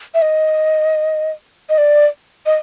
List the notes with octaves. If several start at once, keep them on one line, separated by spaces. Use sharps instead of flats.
E5
D#5
D#5
D5
D#5